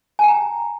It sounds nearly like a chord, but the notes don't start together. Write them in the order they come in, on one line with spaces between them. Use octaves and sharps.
G#5 G5 A#5